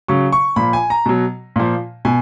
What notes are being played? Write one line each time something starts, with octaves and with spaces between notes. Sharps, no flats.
C#3 F#3 C#6
C#6
A#2 F3 B5
G#5
A#5
B2 F#3
A#2 F3
B2 G#5